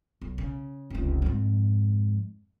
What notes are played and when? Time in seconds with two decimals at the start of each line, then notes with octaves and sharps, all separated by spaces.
0.21 B1
0.38 C#3
0.90 F1 C#2
1.22 F2 G#2